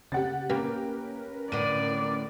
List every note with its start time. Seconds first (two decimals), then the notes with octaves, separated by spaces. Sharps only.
0.12 C#3 G4 F#5 A6
0.50 A#3 C#4 G4 A#4 B4 G5
1.52 A2 D3 D5 D#7